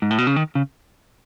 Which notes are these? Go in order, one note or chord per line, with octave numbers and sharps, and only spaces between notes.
G#2
A2
B2
C#3
D#3
C#3